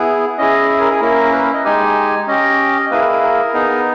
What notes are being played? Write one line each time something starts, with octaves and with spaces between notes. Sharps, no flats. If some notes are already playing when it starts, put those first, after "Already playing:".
Already playing: B3 E4 G#4
C#4 E4 G#4 D#5
E5
A#4
G#4
A#3 C#4 E4 A#4
B4
D#5
G#3 D#4 G4 G#5
C#4 G4 D#5
A#3 E4 G#4 B4
A#4
A#4
A#4
B3 D#4 G#4